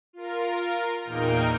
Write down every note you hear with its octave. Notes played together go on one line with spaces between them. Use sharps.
F4 A#4
E2 A#2 A#3 D#4 A#4 G5